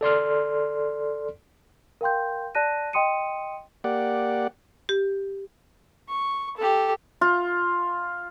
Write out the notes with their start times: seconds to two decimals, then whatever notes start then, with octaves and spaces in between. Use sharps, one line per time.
0.01 A4 D5 C6 F6
2.01 A#4 F5 G5 C6 G6
2.55 D5 A5 F#6 A#6 D#7
2.93 D#5 G5 C6 D#6 C#7 D#7
3.84 A#3 G4 D5 F#5
4.89 G4
6.09 C#6
6.58 G4 A4
7.21 F4